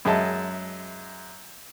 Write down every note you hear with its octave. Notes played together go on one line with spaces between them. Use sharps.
F#2 G#3 D#5 E5 A5